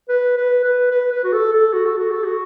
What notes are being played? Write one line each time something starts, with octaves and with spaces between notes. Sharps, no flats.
B4
B4
B4
B4
B4
F#4
A4
A4
F#4
A4
F#4
A4
F#4